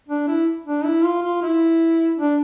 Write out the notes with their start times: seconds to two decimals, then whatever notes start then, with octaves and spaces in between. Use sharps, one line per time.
0.08 D4
0.28 E4
0.66 D4
0.85 E4
1.04 F4
1.23 F4
1.42 E4
2.18 D4